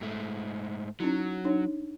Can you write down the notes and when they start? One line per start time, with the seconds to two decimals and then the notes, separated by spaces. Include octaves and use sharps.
0.01 G#2 A3
1.00 F#3 C#4 D#4 E4
1.45 D4 D#4 C#5